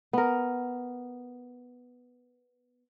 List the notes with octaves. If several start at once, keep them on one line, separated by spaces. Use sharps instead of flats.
B3 A#4